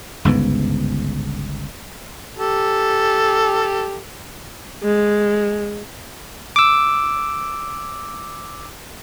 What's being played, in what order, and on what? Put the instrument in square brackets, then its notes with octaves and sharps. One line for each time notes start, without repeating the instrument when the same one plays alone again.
[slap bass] G1 C#2 G#2 B3
[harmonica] G4 A4
[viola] G#3
[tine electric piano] D6 E6